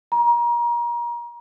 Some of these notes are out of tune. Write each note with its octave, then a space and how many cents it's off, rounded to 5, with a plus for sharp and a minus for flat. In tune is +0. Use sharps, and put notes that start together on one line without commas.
A#5 +30